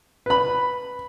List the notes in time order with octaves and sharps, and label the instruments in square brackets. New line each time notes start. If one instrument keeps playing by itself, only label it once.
[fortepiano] B4 B5